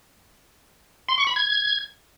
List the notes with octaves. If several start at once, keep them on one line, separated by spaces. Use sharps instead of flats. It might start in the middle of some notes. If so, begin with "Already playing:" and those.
C6
C#6
B5
G#6